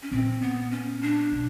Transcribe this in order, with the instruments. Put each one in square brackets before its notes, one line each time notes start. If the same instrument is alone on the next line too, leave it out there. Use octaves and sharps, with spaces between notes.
[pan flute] C#4
[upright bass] A#2 [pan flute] C4
[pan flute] B3
C#4
D4
[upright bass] B2